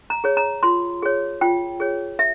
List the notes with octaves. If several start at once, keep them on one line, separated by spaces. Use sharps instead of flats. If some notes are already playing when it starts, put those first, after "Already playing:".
A#5
G#4 C#5
A#5
F4 C6
G#4 C#5
F4 G5
G#4 C#5
E5